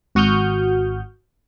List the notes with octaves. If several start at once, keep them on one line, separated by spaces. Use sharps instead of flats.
G#1 F#4 C#6 D#6 F6 G6